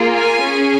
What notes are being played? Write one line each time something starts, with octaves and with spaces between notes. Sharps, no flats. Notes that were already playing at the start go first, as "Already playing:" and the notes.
Already playing: A#3 F4 G#4
G#5
C#4 G#4